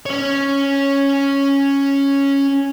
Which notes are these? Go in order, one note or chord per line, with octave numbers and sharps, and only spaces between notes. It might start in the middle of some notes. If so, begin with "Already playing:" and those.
C#4 C#5